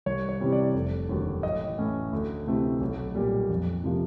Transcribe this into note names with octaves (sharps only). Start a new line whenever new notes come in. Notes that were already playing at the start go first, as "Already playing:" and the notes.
C2 C#5
C#5
C3 E3 G3 C4
D5
F1
D#2 D3 F#3
A1 D#5
A2 E3 A3 C#4
D2
C3 E3 A3 C4
B1
A#2 G3
F2
C3 F3 A#3